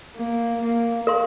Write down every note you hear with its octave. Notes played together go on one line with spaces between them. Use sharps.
A#3
A#3
A#4 F5 C6